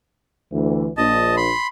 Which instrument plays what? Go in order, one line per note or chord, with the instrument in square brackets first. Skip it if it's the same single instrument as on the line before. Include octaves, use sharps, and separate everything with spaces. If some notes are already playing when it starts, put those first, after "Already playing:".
[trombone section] D2 E3
[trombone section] A#1 [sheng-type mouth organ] D#5 A5
[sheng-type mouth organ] B5 C6